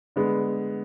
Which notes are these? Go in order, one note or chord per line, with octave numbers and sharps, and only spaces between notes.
D3 G#3 B3